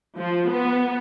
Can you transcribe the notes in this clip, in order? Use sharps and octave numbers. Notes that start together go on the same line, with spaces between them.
F3
B3